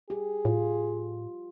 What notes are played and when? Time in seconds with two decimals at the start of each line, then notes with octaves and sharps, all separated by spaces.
0.10 G4 G#4
0.45 A2 F4